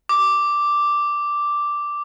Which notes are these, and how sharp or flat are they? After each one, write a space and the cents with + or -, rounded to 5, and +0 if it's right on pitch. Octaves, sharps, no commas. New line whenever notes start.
D6 +0